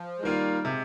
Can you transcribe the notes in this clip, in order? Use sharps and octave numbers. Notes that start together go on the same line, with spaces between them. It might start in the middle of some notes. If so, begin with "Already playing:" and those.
Already playing: F3
G#3
D#3 G3 A#3 F4
C3 G#3